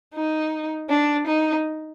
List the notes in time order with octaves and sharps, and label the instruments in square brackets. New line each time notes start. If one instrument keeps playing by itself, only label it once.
[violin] D#4
D4
D#4